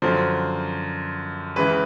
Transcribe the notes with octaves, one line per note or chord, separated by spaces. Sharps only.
F#2 D3 F3 C5
C#2 C#3 E3 B4